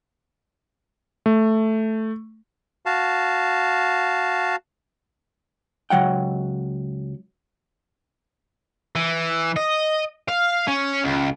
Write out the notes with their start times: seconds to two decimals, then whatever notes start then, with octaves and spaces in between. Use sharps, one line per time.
1.26 A3
2.86 F#4 F5 A5
5.90 C#2 F#3 F#5 G5
8.95 E3
9.56 D#5
10.29 F5
10.68 C#4
11.04 C#2